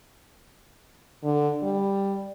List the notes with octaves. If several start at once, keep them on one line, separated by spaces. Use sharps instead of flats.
D3
G3